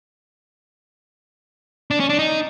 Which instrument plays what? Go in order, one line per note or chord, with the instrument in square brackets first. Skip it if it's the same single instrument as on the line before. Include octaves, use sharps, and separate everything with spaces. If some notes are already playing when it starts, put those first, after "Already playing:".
[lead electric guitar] D4
C#4
D4
D#4